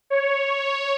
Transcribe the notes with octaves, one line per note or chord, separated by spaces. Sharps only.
C#5